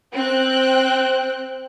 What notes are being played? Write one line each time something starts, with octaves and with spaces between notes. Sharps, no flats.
C4 G5 F#6